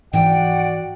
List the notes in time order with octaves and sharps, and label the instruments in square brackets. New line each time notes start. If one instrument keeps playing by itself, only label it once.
[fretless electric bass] G#2 E3 F3 [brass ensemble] F#4 D5 F#5 [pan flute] G5